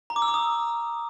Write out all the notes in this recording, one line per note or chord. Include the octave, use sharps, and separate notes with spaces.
A#5
D6
E6
D6
D#6